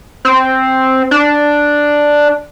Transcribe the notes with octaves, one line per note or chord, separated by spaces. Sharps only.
C4
D4